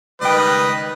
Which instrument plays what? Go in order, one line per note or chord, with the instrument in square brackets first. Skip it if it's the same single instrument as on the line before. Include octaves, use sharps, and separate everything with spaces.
[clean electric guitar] C#2 G5 [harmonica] D#3 G3 D#5 [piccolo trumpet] B4